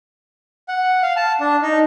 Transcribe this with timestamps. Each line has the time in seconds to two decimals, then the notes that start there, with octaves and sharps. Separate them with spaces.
0.68 F#5
1.02 F5
1.16 A5
1.40 D4
1.62 D#4